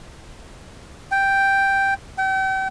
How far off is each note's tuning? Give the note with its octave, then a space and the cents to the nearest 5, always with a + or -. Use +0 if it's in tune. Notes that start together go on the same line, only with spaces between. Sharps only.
G5 +0
G5 -40